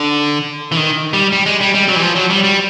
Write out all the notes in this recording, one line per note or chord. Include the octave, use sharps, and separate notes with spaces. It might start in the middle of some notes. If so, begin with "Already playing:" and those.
Already playing: D3
E3
D#3
G3
G3
G#3
G3
G3
F#3
E3
F3
F#3
G3
G3